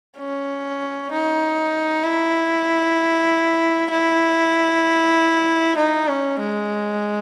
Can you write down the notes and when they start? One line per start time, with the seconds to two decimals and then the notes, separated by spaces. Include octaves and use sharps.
0.17 C#4
1.11 D#4
2.04 E4
3.90 E4
5.77 D#4
6.08 C#4
6.40 G#3